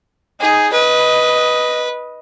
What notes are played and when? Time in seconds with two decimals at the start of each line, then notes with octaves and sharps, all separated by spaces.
0.41 D#4 G#4
0.73 B4 D#5